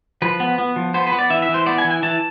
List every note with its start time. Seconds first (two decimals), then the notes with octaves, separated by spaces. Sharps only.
0.22 F3 B4
0.40 B3
0.58 B3
0.76 F3
0.94 B3 C5
1.07 B4
1.12 B3
1.19 D5
1.30 E3 E5
1.42 E5
1.49 E3
1.54 C5
1.66 B3 D5
1.78 G#5
1.84 E3
1.90 G#5
2.03 E3 A5